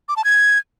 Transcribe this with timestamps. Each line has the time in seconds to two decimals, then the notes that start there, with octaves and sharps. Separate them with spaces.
0.09 D6
0.17 A5
0.24 G#6